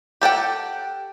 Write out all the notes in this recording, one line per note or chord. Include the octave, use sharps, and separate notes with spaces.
G4 A4 F#5 G5